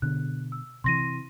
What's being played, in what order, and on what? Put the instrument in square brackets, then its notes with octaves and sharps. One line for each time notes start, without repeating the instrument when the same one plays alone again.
[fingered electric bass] B2 D3 [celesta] F#6
[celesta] E6
[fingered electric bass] C3 D#3 E3 [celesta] C6 A#6 D#7